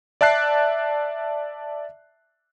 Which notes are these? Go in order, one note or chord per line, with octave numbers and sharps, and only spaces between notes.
D5 E5 A5 F#6 C7